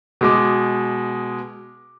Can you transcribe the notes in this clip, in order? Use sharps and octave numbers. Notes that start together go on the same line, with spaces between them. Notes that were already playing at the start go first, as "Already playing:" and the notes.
B2 G#3 D6